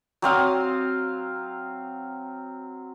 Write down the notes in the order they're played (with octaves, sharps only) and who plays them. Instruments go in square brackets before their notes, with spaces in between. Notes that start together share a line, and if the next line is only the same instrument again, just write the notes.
[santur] F#3 C4 F5 D#6